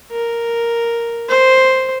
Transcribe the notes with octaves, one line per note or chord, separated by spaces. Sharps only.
A#4
C5